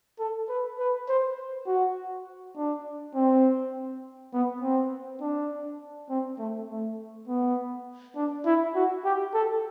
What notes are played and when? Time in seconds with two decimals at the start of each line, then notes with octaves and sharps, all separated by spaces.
0.19 A4
0.49 B4
0.78 B4
1.08 C5
1.66 F#4
2.56 D4
3.15 C4
4.33 B3
4.62 C4
5.21 D4
6.09 C4
6.38 A3
6.68 A3
7.27 B3
8.16 D4
8.45 E4
8.75 F#4
9.05 G4
9.34 A4